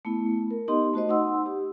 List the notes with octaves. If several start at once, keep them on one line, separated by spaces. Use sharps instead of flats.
A3 B3 E4
A#4
B3 D#4 G4 D#5 C6
A3 F#4 C5 D#5
D#4 F#5 C6 E6
G4